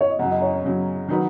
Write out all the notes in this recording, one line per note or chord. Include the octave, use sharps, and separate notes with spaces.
C#5
D#5
F#2 C#3 F#3 F#5
D#5
C#5
D#5
F#2 C#3 F#3
D#3 F#3 D#4 F#4 B4 F#5